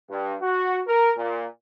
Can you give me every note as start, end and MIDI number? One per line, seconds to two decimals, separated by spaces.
0.10 0.35 43
0.42 0.81 66
0.87 1.11 70
1.17 1.45 46